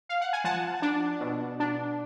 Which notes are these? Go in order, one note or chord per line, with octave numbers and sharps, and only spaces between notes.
F5
F#5
G#5
F3 F#5 A5
D4
B2
D4